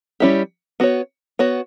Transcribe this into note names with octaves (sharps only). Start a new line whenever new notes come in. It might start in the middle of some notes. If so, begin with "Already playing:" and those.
G3 C#4 E4 G4
B3 F#4 C#5
B3 F#4 C#5